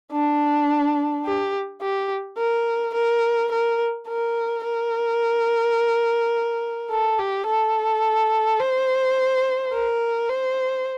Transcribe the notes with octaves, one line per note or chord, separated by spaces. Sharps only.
D4
G4
G4
A#4
A#4
A#4
A#4
A#4
A4
G4
A4
C5
A#4
C5